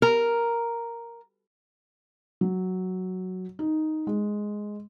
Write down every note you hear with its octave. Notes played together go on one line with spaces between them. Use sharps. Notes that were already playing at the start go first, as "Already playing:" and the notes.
A#4
F#3
D#4
G#3